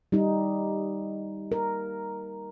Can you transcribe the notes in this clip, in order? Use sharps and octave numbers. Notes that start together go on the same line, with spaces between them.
G3 D#4
A#4